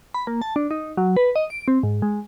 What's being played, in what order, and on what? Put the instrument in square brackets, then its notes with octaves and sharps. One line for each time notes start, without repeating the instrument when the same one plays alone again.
[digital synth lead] B5
A#3
A5
D4
D#4
F#3
B4
D#5
D7
C4
G#2
G#3